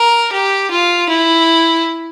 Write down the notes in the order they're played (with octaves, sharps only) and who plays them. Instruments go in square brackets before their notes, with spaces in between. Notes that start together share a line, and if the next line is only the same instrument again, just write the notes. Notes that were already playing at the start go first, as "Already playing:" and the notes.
Already playing: [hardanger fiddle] A#4
G4
F4
E4